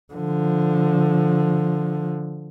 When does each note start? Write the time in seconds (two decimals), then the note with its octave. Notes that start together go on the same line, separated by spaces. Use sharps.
0.13 D3 F3